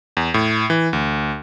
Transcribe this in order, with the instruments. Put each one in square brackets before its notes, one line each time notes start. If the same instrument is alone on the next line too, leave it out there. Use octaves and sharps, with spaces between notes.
[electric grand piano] E2
A2
E3
D2